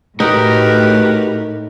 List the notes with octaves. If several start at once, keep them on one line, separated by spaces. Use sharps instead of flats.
A2 D#4 F#4 G4 A#4 B4